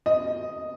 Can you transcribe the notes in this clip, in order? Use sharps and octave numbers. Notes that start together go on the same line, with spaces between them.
D#5